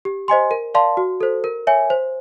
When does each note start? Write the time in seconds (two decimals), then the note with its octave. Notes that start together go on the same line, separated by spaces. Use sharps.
0.05 G4
0.28 C5 D#5 G#5 C6
0.51 A#4
0.74 D5 F5 A5 C6
0.97 F#4
1.21 A4 C5
1.44 A#4
1.67 C#5 E5 G#5
1.90 C5